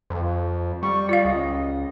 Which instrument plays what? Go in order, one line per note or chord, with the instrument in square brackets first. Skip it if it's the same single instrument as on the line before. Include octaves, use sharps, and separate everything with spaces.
[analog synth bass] F2
[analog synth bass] G3 [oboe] C#6
[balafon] F4 F5 [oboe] D5
[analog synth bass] C#2 [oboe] D#5